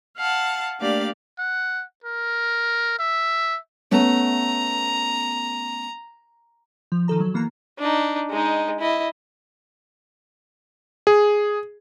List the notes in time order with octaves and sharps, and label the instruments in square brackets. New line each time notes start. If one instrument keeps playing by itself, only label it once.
[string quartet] F5 F#5 A5
A3 A#3 D4 G4 D5 F5
[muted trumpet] F#5
A#4
E5
[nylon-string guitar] A3 B3 C#4 [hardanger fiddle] A#5
[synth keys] F3
D#3 F3 A4 A#5
F#3 A4
E3 A#3 B3 A#5
[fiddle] D4 D#4
G#3 D#4
E4 D#5
[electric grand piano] G#4